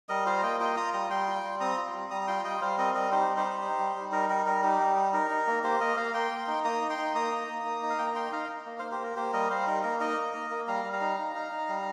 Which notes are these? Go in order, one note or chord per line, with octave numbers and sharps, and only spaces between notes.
G3 A#4 D#5
F4 C5 F5
A#5
A#3 D#5 G5
F4 D#5 G5
F4 A#5 D#6
G3 A#5 D#6
G3 G5 C6
F4
G3
C4 A#5 D#6
F4
G3
G3 A#5 D#6
D#6
F4 G5 C6
G3 D#5 G5
G3 C5 F5
C4 A#4 D#5
G3 A#4 D#5
D#4 G4 C5
G3
G4 C5
D#4
D#4
G3
G3
D#4 A#4
G3 A#4
G3 A#4
D#4 G4
G3
D#4
D#4 A#4
D#4
A#3
A#3 G4 C5
A#3 A#4 D#5
A#3 F5 A#5
A#3 G5 C6
A#3
D#4
A#3 A#5 D#6
D#4
G5 C6
D#4
A#3 A#5 D#6
D#4
A#3
A#3
D#4
F5
A#3 G5
A#5
D#4 G5 C6
D#4 F5 A#5
D#4
A#3
A#3 C5 F5
G4 C5
A#3 A#4
A#3 G4 C5
G3 A#4 D#5
G3 C5 F5
D#4 A#4
A#3 A#4
D#4 A#4 D#5
A#3
A#3
A#3
G3 F5 A#5
G3
F5 A#5
D#4
D#4
D#4
D#4
G3